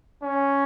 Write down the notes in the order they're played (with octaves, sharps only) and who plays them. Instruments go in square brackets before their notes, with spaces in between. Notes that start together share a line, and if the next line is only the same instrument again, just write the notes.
[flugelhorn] C#4